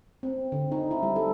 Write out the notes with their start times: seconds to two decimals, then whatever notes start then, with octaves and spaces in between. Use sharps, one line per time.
0.23 C4
0.52 D3
0.72 D#4
0.91 E4
1.03 G3
1.16 A4